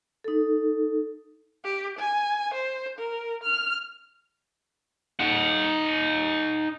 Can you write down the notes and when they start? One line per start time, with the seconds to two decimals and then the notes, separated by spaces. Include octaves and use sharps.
0.24 D#4 A4
1.64 G4
1.99 G#5
2.54 C5
2.99 A#4
3.43 F6
5.20 D#4 F#5